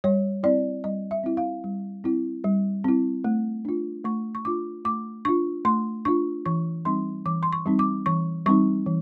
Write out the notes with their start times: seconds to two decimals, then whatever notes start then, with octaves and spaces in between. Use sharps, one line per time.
0.04 G3 C#5
0.43 C4 E4 D5
0.84 G3 D#5
1.11 E5
1.24 C4 E4
1.37 F5
1.64 G3
2.04 C4 E4
2.44 G3
2.84 C4 E4
3.24 A3
3.65 D4 F4
4.04 A3 C#6
4.35 C#6
4.45 D4 F4 D6
4.85 A3 D6
5.25 D4 F4 C#6
5.65 A3 C6
6.05 D4 F4 C#6
6.46 E3 C#6
6.85 G3 C4 D#4 C6
7.26 E3 D6
7.43 C6
7.53 C#6
7.66 G3 C4 D#4
7.79 D6
8.06 E3 C#6
8.46 G3 C4 D#4 C#6
8.86 E3